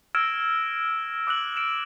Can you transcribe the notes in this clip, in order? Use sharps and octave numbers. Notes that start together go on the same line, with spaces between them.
E6 F6 G#6 A#6 D7 E7
D6 E6 F#6 F#7
D7 E7